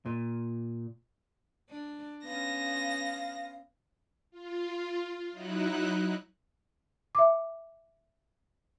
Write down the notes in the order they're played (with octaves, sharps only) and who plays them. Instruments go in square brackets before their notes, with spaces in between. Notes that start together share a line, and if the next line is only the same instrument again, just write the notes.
[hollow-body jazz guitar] A#2
[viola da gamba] D4
[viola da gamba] B3 C#4 [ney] F5 [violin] A#6
[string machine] F4
F#3 D#4 E4 F#6
[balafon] E5 D6